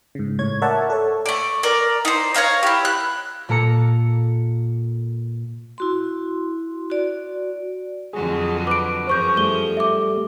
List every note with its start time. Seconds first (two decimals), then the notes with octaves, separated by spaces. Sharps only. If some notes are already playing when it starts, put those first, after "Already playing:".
0.15 G#2 C#3
0.39 A2 C#5 G#6
0.62 A#4 C#5 D5 E5 F#5 A5
0.90 A4 C#5
1.26 A3 D5
1.63 A#4 D5
2.05 D#4 C5
2.34 C#5 D5 F5 A#5
2.63 E4 G4
2.85 F#6
3.49 A#2 A#3 A4 A#5 C#7
5.78 E4 F#4 C6
6.90 F#4 D5
8.13 F2 D3 F#3 G#4
8.67 B4 D6 D7
9.07 F#2 F3 G#4 C5 C#6 G6
9.37 G3 A3 G7
9.77 E5 D6